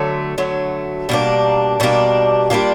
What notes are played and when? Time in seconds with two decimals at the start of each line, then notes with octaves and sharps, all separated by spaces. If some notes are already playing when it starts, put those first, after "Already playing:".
Already playing: D3 F#3 A3
0.38 D3 F#3 A3
1.09 B2 G3 A#3 D4
1.80 B2 G3 A#3 D4
2.50 G3 A#3 D4 F4